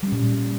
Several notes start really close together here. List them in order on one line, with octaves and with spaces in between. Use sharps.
G3 C#4 A#2